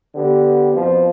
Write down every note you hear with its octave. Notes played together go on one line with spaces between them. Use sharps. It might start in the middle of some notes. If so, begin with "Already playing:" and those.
D3 B3 G4
F2 B2 F3